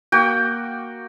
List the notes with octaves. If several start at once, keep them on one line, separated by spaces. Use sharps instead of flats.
A#3 F#4 G5